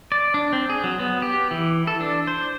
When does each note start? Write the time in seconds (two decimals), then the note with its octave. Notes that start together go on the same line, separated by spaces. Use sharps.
0.12 D5
0.34 D4
0.53 C4
0.69 G#4
0.84 F#3
0.99 B3
1.22 G4
1.51 E3
1.87 A4
2.00 D4
2.27 C5